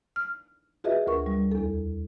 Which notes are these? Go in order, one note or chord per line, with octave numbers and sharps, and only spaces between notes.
F6
F4 F#4 G#4 B4 D#5 E5
D2 A#4 C#6
G3
E2 A4